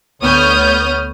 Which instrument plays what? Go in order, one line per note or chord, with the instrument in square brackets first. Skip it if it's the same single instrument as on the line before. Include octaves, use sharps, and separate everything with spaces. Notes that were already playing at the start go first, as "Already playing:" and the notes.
[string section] D2 B3 C#5 D#6 F6 G6